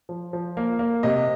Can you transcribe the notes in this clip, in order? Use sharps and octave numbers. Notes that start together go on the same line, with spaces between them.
F3
F3
A#3
A#3
C3 D#5